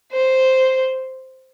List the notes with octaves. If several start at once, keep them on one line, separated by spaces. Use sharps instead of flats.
C5